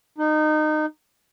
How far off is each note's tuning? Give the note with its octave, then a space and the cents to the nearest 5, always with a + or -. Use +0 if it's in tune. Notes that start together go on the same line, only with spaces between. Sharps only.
D#4 -20